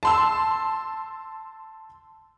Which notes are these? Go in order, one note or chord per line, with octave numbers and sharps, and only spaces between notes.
A5 C6 E6